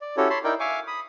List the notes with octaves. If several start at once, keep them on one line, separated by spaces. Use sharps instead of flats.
D5
C#4 E4 F#4 G4 A4 C#5
C#5 A5 B5 C6
D#4 E4 A#4 D5 G5
E5 F5 G#5 C#6 D6
B5 D#6